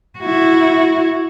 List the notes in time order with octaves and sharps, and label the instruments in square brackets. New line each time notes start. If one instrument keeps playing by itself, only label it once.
[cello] E4 F#4